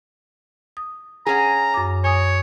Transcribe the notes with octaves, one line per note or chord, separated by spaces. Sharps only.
D#6
C#4 G#4 F#5 G#5 A#5
F#2 D6
C#5 G#5 D#6